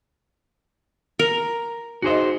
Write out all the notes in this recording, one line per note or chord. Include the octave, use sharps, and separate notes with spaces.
A#4
D#4 F#4 G#4 C5 D#5